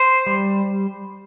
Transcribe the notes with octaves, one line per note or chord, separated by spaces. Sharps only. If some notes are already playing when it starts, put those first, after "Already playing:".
Already playing: C5
G3